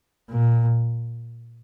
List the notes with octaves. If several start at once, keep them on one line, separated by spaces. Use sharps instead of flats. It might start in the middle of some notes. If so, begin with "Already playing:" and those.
A#2